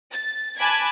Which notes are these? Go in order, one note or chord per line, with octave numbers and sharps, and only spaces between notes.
A6
G#5 A5 B5 D6 F#6 G#6